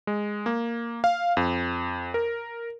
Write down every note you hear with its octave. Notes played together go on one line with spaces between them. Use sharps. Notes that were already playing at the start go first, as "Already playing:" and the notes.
G#3
A#3
F5
F2
A#4